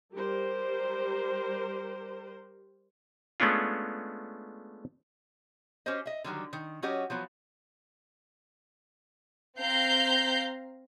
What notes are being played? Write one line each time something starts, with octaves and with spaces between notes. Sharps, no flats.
G3 G4 A#4 C5
G#3 A3 B3 C#4 D4 F4
C#4 F#4 G4 C5 D#5
D#5 E5
D3 D#3 F#3 G3
D#3
F#3 C#4 F#4 G4 D#5
F3 F#3 B3
C4 F5 A#5 G6 C7